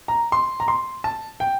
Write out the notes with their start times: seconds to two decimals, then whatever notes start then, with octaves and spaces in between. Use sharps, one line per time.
0.08 A#5
0.32 C6
0.60 A#5
0.68 C6
1.04 A5
1.40 G5